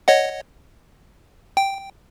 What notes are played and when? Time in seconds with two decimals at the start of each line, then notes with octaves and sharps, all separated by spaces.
0.08 C#5 D#5 F#5
1.57 G5